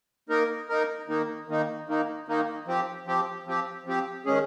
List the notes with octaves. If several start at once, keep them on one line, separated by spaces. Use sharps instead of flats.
A#3 D#4 A#4
A#3 D#4 A#4
D#3 A#3 D#4
D#3 A#3 D#4
D#3 A#3 D#4
D#3 A#3 D#4
F3 C4 G4
F3 C4 G4
F3 C4 G4
F3 C4 G4
D#3 G#3 C#4 G#4